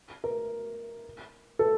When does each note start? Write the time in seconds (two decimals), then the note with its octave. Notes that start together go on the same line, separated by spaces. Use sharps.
0.24 A#4
1.59 A4